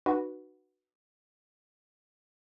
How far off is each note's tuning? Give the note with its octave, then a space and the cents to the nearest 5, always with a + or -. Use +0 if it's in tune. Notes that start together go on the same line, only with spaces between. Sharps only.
D#4 -45 F#4 +0 B4 -10